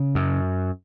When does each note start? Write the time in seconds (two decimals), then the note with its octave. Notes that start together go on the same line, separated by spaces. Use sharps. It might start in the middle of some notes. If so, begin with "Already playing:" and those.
Already playing: C#3
0.15 F#2